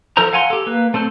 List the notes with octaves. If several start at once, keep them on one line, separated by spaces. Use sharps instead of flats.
F3 A4 A#4 C5 A#5
F5 F#5 G#5 A#5 C6
G4 A4
A#3 B4
A3 C4 A4 C5